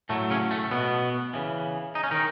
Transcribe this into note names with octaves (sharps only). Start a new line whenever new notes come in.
A2 F#3 A3
C#3 C#4
A3
B2 B3
C#3 E3
D#4
C#4
D#3 D#4